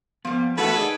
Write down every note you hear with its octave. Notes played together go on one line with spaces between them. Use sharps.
F3 G3 B3
E3 A3 B3 E4 F#4 A4 B4 F#5
D#4 G#4 D5